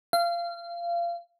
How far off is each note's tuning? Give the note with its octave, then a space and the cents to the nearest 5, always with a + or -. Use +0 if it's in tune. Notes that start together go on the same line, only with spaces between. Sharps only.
F5 -25